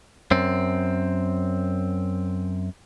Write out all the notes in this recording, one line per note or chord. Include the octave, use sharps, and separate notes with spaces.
F#2 C4